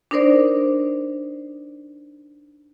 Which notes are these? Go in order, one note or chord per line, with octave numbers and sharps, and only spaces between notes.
D4 D#4 A#4 C5 D5